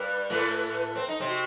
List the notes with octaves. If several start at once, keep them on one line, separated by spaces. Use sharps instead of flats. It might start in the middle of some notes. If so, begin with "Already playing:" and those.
Already playing: G2 G3 B4
A2 A3
C4
D#4
C3 C4
F#4